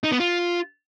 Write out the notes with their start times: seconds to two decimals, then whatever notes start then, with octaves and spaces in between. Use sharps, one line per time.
0.04 D#4
0.12 B3
0.20 F4